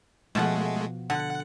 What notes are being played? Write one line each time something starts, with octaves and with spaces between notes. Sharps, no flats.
B2 F3 G#3 A3 F#5
D3 F#5